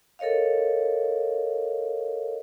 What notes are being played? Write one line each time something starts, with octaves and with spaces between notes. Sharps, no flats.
A4 A#4 C#5 D#5 F5